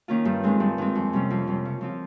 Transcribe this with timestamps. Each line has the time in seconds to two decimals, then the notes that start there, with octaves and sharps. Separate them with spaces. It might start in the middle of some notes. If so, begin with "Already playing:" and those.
0.08 D#3 A#3 C#4 F4
0.25 G2
0.43 D#3 G#3 C4
0.60 G2
0.78 D#3 G#3 C4
0.95 F2
1.13 C3 G3 C#4
1.30 F2
1.47 C3 G3 C#4
1.65 C#3
1.81 F3 C4 F4